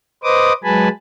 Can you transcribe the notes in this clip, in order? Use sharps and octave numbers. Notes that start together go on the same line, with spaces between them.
B4 C5 D#5 D6 D#6
F#3 G#3 B4 G#5 A5 B5